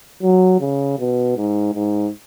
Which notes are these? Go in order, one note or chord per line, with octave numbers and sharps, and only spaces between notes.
F#3
C#3
B2
G#2
G#2